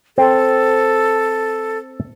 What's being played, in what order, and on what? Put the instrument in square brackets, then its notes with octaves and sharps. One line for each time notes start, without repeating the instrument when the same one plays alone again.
[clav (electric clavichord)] C4 [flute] A4